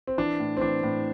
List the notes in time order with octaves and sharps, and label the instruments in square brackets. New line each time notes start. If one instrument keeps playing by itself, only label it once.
[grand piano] C4
E3 D4
A2
C4
E3 D4
A2